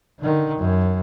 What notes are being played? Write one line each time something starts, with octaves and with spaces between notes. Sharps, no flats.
D3 D#3
F#2